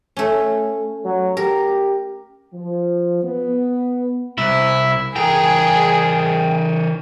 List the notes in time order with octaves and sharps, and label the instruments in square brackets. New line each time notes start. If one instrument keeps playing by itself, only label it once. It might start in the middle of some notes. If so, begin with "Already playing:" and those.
[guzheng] A3 C#4
[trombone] F#3
[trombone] G4 [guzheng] A#4
[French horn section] F3
B3
[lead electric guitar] C2 [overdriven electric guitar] E4
[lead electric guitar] E3 A#4 [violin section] G#4 [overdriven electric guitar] G5